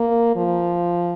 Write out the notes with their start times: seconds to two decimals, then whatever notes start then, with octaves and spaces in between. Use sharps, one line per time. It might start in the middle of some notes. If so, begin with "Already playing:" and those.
Already playing: A#3
0.36 F3